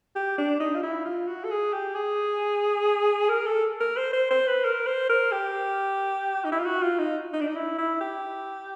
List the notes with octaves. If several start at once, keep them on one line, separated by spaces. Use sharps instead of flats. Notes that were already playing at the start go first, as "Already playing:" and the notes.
G4
D4
D#4
F4
E4
F4
F#4
A4
G#4
G4
G#4
A#4
A4
A#4
C5
C5
C5
B4
A#4
C5
A#4
G4
D#4
E4
F4
F#4
F4
D#4
D#4
D4
D#4
E4
E4
G4